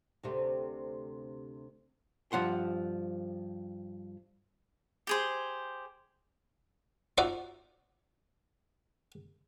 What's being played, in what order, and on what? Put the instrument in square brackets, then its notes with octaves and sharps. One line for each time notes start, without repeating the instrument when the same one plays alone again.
[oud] D2 C3 A3
[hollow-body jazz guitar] G2 F3 F#5 C6
[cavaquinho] G4 G#4 C5
[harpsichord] D#4 F4 F#4 C5 D5 E5